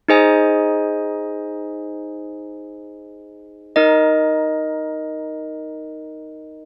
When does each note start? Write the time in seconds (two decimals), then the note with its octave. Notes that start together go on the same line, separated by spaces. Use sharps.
0.08 D#4 G#4 C5 D#5 G#5
3.76 D#4 A#4 D#5